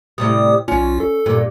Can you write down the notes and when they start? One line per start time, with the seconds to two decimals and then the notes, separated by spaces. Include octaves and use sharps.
0.18 A2 C3 G3 D#6
0.68 B1 C#4 F4
1.00 A4
1.26 G2 A#2